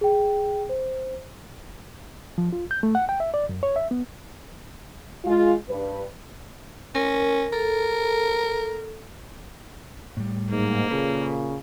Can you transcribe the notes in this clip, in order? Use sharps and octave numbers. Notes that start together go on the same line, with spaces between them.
G#4 G5
C5
F3
F4
G6
A3
F#5
G5
E5
D5
F#2
C#5
E5
B3
G#3 F4
G2 B4
C#4 A#4
A4 A#4
A2 G3
G#2 A#3
A#2 C#3 G#4 A4 B4